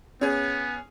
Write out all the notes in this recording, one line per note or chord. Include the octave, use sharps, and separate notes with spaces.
B3 C#4 G#4